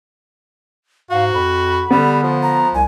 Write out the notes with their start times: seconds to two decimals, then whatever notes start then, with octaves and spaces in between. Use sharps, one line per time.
1.10 G#2 F#4 F5
1.34 F2 B5
1.91 D3 G3 B3
2.23 F3
2.42 A#5
2.74 C2 G#5